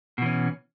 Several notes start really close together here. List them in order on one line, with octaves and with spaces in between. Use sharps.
B2 E3 C#4